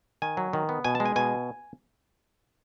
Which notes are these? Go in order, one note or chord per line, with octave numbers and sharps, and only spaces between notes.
D#3 G#5
F#3
D#3
B3
B2 G#5
A5
G#3
G#5
B2 G#5